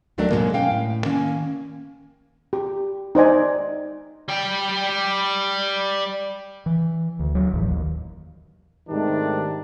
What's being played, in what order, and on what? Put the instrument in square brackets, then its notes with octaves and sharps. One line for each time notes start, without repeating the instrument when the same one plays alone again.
[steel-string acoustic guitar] D#2 D#3 F#3 A3 D4 A#4
G#2 B2 F#3 G#3 A#3
C#4 F5 G5
A2
D#3 A#3 C#4
[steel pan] G4
D#4 C5 D5 G#5
[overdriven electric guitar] G3 G5
[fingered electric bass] E3
D2
D#2 F#3
E1 A1 E2
D#2
[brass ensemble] G#2 C3 D#3 G3 A3 D4